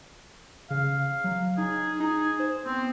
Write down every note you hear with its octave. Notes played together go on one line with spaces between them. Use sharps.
C#3 F5
F#3
D#4 G#4
D#4
C5
B3 C4